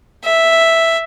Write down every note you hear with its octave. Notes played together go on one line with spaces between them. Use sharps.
E5